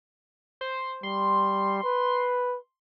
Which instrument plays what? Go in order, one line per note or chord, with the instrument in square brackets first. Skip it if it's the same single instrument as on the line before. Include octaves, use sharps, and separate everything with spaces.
[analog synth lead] C5
[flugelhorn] G3 [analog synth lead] C6
[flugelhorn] B4